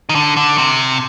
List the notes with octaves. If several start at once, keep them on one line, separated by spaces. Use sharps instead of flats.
D#3
D3
D3
C3